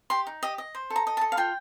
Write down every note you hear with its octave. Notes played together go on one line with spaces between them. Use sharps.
G4 C6
D#4
G4 D#5
D#5
C5
A4
A#5
D#5
A5
A4
F5
F4 G5